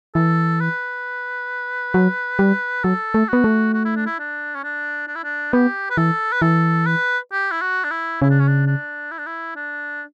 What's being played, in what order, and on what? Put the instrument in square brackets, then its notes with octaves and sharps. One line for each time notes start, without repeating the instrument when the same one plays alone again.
[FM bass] E3 [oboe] A4
[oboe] B4
[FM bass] F#3
G3
[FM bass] F#3 [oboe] A4
[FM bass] A3
[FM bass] B3 [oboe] F#4
[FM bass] A3
[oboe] F#4
E4
D4
E4
D4
C#4
D4
D4
E4
D4
[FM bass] B3 [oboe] G4
[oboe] B4
[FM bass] E3 [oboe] A4
[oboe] B4
[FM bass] E3 [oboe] A4
[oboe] B4
G4
E4
F#4
D4
E4
[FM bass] C#3 [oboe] E4
[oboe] D4
C#4
D4
D4
E4
D4
E4
D4